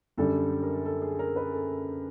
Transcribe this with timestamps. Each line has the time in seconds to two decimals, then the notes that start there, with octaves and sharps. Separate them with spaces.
0.18 F#2 D3 G3 A4
0.63 A#4
0.85 A4
1.02 G#4
1.19 A#4
1.36 B4
1.53 A4